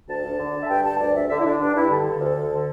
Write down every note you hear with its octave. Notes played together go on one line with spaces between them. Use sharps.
D2 A5
D2
D3
D3
E5
G2 G5
G2 A5
D2 D5
D2 E5
D3 E5
E4
D3 D4
G2 D4
G2 E4
D3 A4
D3
D2
D2
D3